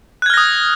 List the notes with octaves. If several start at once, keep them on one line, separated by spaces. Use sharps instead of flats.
D#6 F6 F#6 G#6 A#6